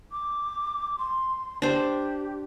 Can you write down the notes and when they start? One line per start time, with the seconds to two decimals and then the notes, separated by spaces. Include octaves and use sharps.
0.12 D6
0.99 C6
1.62 D4 G4 C5